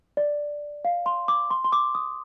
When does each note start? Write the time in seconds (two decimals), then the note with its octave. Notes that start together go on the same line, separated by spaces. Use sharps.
0.17 D5
0.85 F5
1.06 C6
1.28 D6
1.51 C6
1.64 C6
1.72 D6
1.95 D#6